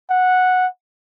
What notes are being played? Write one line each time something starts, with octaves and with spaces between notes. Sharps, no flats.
F#5